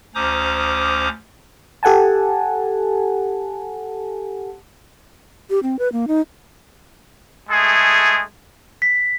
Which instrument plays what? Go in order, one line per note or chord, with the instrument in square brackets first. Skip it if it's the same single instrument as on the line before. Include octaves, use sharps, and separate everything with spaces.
[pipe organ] D2 C#4 C5 A#5 D6 D#6
[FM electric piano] G4 A4 F#5 G#5 A5
[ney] G4
C4
B4
A#3
D#4
[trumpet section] G#3 A3 G#4
[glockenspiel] B6